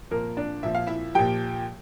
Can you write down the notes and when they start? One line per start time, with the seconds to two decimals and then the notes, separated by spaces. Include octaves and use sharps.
0.11 A#2 F3 A#3 A#4
0.37 D4 D5
0.63 A#2 F3 E5
0.75 F5
0.87 E4 E5
1.15 A#2 F3 G4 G5